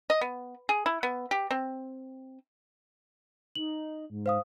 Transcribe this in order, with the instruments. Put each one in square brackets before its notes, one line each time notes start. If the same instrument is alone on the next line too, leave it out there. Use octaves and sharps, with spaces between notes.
[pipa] D#5
B3
G#4
E4
B3
G4
C4
[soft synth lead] D#4 [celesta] F#7
[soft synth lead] G#2
[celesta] C5 F5 D#6